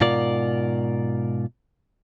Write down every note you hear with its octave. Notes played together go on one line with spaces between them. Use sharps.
G#2 B2 F4 A#4 D5